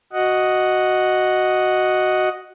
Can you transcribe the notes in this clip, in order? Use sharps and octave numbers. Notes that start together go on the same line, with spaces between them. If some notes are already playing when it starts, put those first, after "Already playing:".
F#4 D#5 F#5